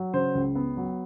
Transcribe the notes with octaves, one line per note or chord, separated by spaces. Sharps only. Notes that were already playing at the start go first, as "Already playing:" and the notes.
Already playing: F#3
C#3 C5
C#2
B3
F#3